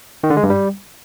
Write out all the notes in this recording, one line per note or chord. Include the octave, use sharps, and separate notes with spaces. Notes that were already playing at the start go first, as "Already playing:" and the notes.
D#3
D3
G#3
G2
G3